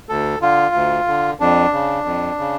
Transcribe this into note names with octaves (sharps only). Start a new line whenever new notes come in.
D2 A4
D3 F4
D2
D3
F2 D4
C#3
F2
C#3